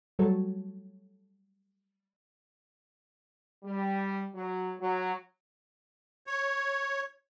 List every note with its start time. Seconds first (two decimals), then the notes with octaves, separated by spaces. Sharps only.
0.19 F#3 G3 A3 F#4 A4 C#5
3.63 G3
4.34 F#3
4.78 F#3
6.27 C#5